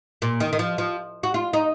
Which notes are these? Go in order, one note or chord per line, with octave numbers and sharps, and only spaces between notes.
A#2
D#3
D#3
F3
F3
F#4
F4
D#4